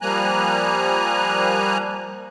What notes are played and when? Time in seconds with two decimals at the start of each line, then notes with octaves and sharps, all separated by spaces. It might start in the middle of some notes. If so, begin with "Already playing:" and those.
0.02 F3 G3 A#3 G#5 A#5 F#6